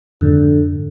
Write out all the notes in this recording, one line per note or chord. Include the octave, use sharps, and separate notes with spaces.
F2 G#2 D3